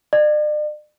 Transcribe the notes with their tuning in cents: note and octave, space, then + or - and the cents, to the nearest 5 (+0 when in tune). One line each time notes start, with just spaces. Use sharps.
D5 +40